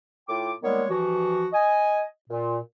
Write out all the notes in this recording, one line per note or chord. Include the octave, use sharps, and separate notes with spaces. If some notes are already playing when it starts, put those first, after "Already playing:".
A2 F4 G5 D6
D#3 G3 G#3 A#3 B3 C#5
G2 E3 F3 F#4
D#5 G#5
A#2